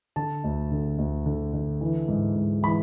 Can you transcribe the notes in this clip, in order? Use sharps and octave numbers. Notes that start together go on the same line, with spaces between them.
D3 A5
D2
D3
D2
D3
D3
E3
G#2
G#2
E3 B5